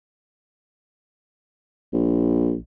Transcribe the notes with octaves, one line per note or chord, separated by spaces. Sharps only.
A#1